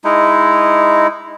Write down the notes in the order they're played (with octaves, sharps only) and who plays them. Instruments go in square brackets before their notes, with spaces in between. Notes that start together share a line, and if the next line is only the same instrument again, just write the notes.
[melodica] G#3 D#4 E4